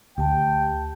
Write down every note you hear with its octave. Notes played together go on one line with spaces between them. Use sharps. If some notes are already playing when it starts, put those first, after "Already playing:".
D2 G4 G5 A5